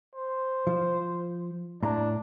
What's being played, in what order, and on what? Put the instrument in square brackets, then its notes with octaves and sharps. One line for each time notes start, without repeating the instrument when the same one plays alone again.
[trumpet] C5
[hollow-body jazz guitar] F3
[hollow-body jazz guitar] A2 A#5 [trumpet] D4